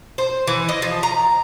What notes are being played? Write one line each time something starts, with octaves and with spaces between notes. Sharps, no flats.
C5
E3
D#5
F3
A#5